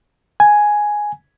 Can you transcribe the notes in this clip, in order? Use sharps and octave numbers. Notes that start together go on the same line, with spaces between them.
G#5